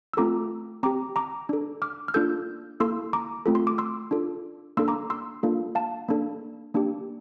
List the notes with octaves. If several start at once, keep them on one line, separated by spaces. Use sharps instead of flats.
E6
A3 C4 F4 A4 A#5 D6
C4 G4 A#5 D6
A#5 D6
D4 A4
D6 F6
F6
A#3 D4 F4 A4 E6 G6
A#3 E4 A4 C6 E6
A#5 D6
A3 C4 F4 A4
C6
D6
C6 E6
D4 F4 A4
A#3 D4 A4 C6 E6
A#5 D6
C6 E6
A#3 D4 F4 A4
F5 A5
A#3 D4 A4
A#3 D4 G4